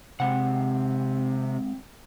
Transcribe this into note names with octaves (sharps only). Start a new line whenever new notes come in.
C3 G#3 C4 F#5